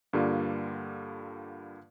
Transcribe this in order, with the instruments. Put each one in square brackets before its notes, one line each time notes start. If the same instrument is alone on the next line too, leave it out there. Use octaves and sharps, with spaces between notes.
[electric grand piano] G2 D3 G3 A#3 F4